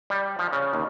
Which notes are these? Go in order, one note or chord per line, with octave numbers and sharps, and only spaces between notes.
G3
F3
C#3
D#2